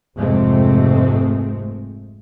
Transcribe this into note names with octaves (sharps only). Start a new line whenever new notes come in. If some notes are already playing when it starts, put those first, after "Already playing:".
F1 G#2 C3 G#3 A3 C4